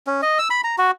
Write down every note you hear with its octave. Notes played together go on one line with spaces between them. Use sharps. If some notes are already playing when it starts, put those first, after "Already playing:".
C#4
D#5
E6
B5
A#5
F#4